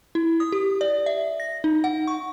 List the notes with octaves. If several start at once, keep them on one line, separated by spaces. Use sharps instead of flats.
E4
D#6
G4
D5
E5
A#6
D#4
F#5
C#6